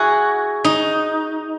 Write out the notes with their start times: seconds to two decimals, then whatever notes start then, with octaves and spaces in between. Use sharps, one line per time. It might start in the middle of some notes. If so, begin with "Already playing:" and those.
Already playing: E4 F#4 G#4
0.64 D#4